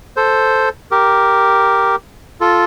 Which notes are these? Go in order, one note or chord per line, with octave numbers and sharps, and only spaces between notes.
A4 C5
G4 A#4
F4 A4